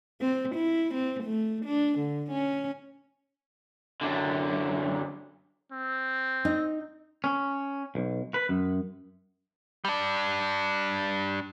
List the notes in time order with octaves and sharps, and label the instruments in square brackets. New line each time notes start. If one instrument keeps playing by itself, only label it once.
[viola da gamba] C4
E4
C4
A3
D4
D3
C#4
[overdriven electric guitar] F#2 D3
[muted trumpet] C4
[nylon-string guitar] D#4
[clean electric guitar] C#4
B1
B4
F#2
[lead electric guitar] G3 D4